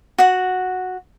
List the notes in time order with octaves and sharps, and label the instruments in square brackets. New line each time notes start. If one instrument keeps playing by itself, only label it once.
[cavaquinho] F#4 F#5